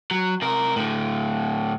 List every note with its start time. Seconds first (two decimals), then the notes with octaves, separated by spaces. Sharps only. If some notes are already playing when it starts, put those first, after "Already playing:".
0.11 F#3
0.42 C3 A#4
0.76 A2 D3